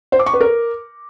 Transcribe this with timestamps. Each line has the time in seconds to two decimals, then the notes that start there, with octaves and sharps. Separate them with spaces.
0.12 C5
0.19 D6
0.26 C#6
0.34 B4
0.41 A#4